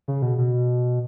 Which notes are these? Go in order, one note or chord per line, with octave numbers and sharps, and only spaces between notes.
C#3
B2
B2